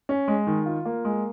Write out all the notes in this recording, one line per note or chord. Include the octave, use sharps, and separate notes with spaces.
C#4
G#3
D#3
F4
A#3
G#3